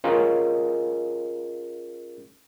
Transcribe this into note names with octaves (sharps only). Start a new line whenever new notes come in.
C#4 F4 G#4 A#4 D#5